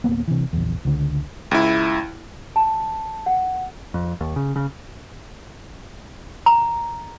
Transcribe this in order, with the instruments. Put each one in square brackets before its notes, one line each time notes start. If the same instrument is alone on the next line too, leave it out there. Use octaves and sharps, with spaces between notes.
[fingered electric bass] D1 A#3 B3
C3 E3
A#1 E2
C#2 D3
[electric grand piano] C#2 E4
[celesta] A5
F#5
[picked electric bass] F2
D#2
C#3
C#3
[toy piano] A#5